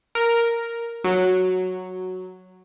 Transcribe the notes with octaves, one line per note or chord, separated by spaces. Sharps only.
A#4
F#3